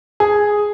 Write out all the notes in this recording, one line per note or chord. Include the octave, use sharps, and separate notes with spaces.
G#4